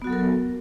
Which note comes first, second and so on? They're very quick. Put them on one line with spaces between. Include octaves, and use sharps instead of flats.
B3 F#4 F#3 A4 A#4